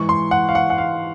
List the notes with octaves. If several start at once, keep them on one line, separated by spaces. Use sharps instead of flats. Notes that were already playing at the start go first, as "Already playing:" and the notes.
Already playing: G#2 E3 C#6
C6
F#5
F5
F#5
F#5
F5